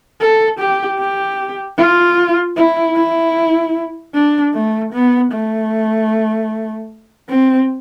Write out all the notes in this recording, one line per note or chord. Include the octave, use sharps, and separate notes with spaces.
A4
G4
G4
F4
E4
E4
D4
A3
B3
A3
C4